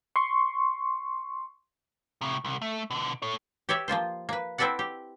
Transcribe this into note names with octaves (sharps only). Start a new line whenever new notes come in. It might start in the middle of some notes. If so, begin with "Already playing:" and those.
C6 C#6
A2 C3
C2
A3
B2 D3
A4 C#5
G4 C#5 D5 E5
F3 A#3 F4 C5
A#3 B4
C4 E4 A4 B4 D5 F#5
G4